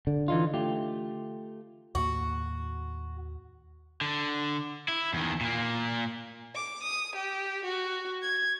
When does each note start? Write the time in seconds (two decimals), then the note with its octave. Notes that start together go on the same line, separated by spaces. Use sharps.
0.07 D3
0.28 E3 D#4 F4
0.54 A3 F4 G4
1.95 D#2 A2 A#3 F#4
4.01 D3
4.88 E4
5.14 E2 D#3
5.41 A#2 A#3
6.55 D6
6.83 D#6
7.16 G4
7.64 F#4
8.22 G#6